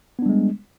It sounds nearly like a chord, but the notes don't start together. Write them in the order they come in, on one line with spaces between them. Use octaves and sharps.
B3 D4 G3 G#3